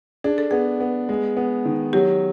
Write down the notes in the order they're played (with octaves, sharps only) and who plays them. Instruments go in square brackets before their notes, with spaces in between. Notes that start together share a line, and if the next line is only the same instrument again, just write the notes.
[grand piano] D4 [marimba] G#4
[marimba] A4
[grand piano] B3 [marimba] G#4
[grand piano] B3
G#3
B3
D#3
[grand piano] F#3 [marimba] G4